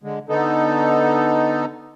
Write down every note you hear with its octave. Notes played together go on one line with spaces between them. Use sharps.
D3 G#3
D3 B3 D#4 A4